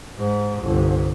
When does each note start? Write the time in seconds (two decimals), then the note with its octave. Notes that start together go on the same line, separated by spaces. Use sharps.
0.17 G#2
0.61 G1 C2